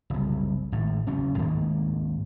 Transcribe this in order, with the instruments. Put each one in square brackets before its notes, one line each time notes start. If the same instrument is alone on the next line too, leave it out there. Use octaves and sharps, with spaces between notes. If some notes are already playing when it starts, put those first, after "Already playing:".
[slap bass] F#1 C2
G#1 A2
F#1 E2 C#4
D2 G#2 D#3 A#3